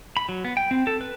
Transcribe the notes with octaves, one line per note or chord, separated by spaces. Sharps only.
B5
F#3
B3
G5
C4
A4
B4